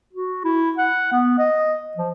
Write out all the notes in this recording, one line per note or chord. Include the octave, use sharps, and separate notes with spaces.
F#4
E4
F#5
B3
D#5
F3